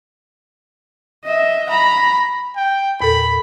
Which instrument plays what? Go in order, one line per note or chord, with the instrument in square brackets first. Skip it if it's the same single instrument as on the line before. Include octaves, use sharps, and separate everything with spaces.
[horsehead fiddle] D#5 E5
A#5 B5
[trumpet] G5
[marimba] E2 A#2 A4 [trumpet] B5